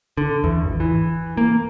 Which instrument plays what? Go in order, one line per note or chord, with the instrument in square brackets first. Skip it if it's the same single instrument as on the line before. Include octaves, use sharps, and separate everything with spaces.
[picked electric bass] D3
E2
G#1
E3
A#3